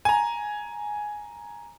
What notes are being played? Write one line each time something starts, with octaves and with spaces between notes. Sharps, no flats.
G#5 A#5